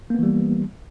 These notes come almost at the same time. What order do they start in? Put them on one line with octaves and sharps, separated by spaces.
A#3 B3 E3 G3